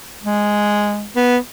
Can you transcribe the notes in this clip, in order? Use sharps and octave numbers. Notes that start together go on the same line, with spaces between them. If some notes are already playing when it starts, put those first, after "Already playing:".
G#3
B3